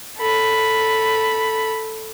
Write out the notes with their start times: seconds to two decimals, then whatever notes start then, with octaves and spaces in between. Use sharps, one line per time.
0.17 A4 B5